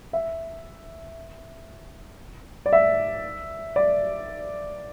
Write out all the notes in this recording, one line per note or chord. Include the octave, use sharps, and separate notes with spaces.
E5
D5
E5
D5